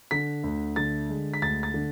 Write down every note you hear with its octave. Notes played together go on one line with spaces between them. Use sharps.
D3 B6
D2
D3 A6
G#3
B6
D2 A6
A6
D3